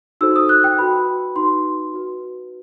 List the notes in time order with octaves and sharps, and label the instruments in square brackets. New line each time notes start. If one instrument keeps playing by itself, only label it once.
[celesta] D#4 F#4 A4 C5 E6
D#6
F#6
G5
F#4 B4 B5
D#4 F#4 B4 C6
F#4 B4